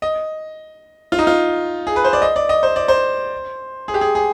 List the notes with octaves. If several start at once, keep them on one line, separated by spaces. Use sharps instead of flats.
D#5
F4
D#4
F4
G#4
B4
C5
D5
D#5
D5
D#5
C5
D5
C5
G#4
G4
G#4
G#4